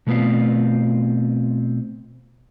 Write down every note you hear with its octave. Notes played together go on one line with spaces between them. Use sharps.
B2 A3 B3 C4 F4